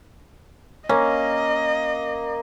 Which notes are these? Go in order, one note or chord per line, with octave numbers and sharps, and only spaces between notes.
A#3 C#4 D#5